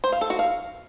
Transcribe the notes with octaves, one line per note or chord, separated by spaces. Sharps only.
C5
F5
A4
F#4
F5